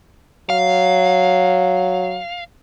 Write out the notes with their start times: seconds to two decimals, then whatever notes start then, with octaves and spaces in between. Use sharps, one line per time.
0.50 F#3 F5